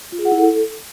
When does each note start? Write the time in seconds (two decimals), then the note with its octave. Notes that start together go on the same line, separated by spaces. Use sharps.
0.12 F4
0.19 G#4
0.25 F#5
0.32 E4
0.38 A4